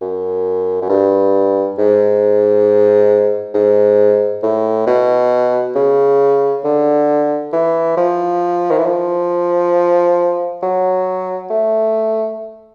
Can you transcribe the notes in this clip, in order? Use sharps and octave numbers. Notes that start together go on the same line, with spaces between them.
F#2
F#2
G2
G#2
G#2
A2
B2
C#3
D3
E3
F3
D#3
E3
F3
F#3
A3